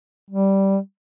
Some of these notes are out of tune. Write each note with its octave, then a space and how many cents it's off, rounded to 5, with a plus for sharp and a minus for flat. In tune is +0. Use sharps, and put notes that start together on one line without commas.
G3 -10